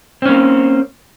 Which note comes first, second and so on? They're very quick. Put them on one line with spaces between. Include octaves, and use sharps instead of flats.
C4 C#4 A#3